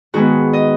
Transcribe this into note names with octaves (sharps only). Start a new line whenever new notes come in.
G#2 D#3 G#3 B3 F#4
D#5